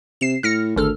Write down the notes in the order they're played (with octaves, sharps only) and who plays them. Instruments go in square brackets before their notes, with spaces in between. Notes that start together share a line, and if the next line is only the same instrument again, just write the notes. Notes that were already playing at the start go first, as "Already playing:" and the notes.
[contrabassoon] C3 [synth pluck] C7 E7
[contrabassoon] A2 [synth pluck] F6 A#6 C#7
[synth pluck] G#1 A4 F6 [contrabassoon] D2